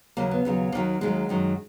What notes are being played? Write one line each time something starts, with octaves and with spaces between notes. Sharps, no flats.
D#2 C#3 F#3 A#3
B3
D#2 C#3 F#3
D#2 D#3 F#3 A#3
D#2 D#3 F#3 G#3
F#2 D#3 F#3